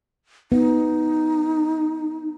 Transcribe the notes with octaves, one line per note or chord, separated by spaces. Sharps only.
B3 D#4